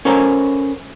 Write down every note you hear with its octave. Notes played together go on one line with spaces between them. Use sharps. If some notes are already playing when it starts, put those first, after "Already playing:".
C#4 A4 A#4 C5 A#5